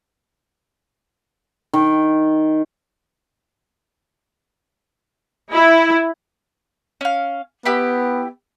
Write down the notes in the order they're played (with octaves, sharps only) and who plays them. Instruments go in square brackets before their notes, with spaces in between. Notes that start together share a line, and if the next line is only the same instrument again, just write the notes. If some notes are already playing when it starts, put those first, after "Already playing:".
[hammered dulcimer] D#3
[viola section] E4
[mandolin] C#4 F5
[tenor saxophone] B3 [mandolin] E4 G4 B5